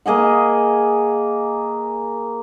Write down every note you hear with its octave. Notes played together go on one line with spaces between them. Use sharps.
A#3 G#4 D#5 F#5